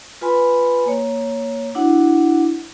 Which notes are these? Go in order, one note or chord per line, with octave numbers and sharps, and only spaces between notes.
F4 B4 G#5 B5 C6
A#3 C#5
D4 E4 F#4 F#5